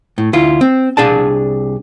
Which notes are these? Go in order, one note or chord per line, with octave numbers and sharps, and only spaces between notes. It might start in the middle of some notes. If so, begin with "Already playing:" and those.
A2
D2 E4 F4
C4
C2 D4 G#4 D5 A5